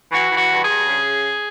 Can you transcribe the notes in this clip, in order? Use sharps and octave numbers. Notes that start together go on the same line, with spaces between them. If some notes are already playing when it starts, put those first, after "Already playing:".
E3 F#4
E3
F#4
G2
G#4
G2
C#3